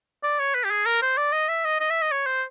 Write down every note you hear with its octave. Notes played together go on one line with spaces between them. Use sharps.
D5
C#5
B4
G4
G#4
A#4
C5
D5
D#5
E5
D#5
D#5
E5
D#5
C#5
C5